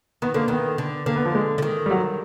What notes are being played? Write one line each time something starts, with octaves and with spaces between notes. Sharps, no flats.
D#3 B3
D3 A#3
D#3 B3
D3
D3 A#3
B3
F3
G#3
D3
D#3
G3
F#3